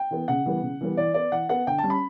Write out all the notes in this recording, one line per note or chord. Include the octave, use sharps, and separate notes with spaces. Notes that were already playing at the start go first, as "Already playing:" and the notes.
Already playing: G5
E3 B3
C#3 F#5
E3 G3 B3
C#3
E3 G3 B3
E3 D5
B3 D5
E3 F#5
B3 F#5
D3 G5
A5
G3 C#4
B5